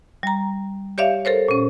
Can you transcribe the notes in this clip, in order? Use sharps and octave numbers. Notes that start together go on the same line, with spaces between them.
G3 A#5
G4 C#5 D5 E5 F5
A4 A#4 C5 C#5
A#2 C#4